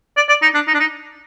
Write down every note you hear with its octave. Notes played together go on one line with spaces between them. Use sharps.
D5
D5
D#4
D4
D#4
D4
D#4